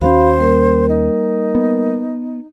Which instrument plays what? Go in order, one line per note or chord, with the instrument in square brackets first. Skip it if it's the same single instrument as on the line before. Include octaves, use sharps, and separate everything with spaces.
[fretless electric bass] D#2 A3 C#4 [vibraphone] F#4 F5 B5 [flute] C5
[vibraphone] G3 A#3 A#4
[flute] D#4
[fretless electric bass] B3